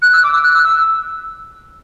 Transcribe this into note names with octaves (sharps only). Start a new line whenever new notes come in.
F#6
E6
D6
E6
F#6
E6
E6